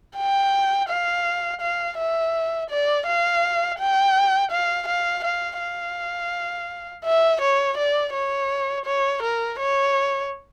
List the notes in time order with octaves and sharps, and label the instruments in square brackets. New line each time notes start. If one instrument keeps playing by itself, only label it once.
[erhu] G5
F5
F5
E5
D5
F5
G5
F5
F5
F5
F5
E5
C#5
D5
C#5
C#5
A#4
C#5